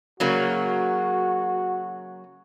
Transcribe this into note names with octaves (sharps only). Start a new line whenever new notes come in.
C#3 F#3 A#3 F#4